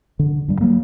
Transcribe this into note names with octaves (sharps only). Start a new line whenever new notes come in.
D3
G2 G3
F#3 A#3